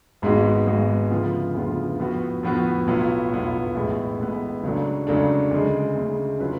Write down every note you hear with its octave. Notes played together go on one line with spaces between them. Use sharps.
G#1 G#2 G#3 B3 F#4
G#1 G#2 G#3 B3 F#4
D2 C#3 F3 B3 F4
D2 C#3 F3 B3 F4
A2 F3 B3 F#4 B4
A2 F3 B3 F#4 B4
B1 A2 F#3 B3 F4
B1 A2 F#3 B3 F4
A1 A2 G#3 B3
A1 A2 G#3 B3
C#2 C#3 F#3 A3 D4
C#2 C#3 F#3 A3 D4
D2 C#3 G#3
D2 C#3 G#3
C#3 F#3 C#4 F4 B4